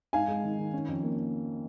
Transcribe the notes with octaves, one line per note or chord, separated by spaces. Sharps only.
G#2 F5 G#5
G#3
D#3
D#3
C#4
F2
A#3